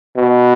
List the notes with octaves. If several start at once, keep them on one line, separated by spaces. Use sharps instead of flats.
B2